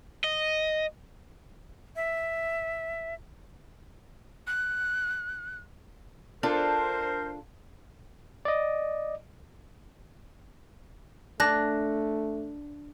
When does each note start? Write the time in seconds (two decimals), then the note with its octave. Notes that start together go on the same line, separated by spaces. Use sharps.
0.24 D#5
1.96 E5
4.47 F#6
6.43 D4 F4 A4 A#4 C5
8.45 D5 D#5
11.40 A3 D4 F#6 A#6